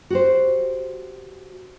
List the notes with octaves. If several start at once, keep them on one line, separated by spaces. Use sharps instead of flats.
F#4 G4 C5